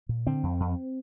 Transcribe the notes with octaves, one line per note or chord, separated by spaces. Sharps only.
A#2
D3 C4
F2
F2